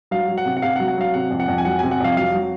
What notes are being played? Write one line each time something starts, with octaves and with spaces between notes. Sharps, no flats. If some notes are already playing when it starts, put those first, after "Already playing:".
F#3 F5
F#3
F#5
C3
F#5
C3 F5
F#5
F#3
F#5
F#3 F5
C3 F#5
F2
F#5
F2
G#5
F#3 F#5
G#5
C3
F#5
F2 F5
F#3 F5
F#3